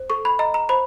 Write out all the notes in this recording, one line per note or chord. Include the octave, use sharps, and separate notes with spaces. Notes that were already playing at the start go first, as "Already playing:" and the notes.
Already playing: C5
A4 C#6
B5
D#5 A#5
A#5
C5 B5